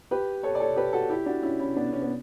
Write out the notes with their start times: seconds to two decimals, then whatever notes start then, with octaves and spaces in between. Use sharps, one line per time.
0.11 G4 B4
0.43 A4 C#5
0.55 D5
0.60 A4 C#5
0.76 G4 B4
0.93 F#4 A4
1.10 E4 G4
1.26 D4 F#4
1.43 C#4 E4
1.60 C#4 E4
1.76 B3 D4
1.93 C#4
2.02 B3